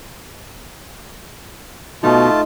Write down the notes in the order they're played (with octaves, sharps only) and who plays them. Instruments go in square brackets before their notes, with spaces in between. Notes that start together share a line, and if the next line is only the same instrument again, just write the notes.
[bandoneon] B2 [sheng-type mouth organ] A3 F4 A5 [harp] D#4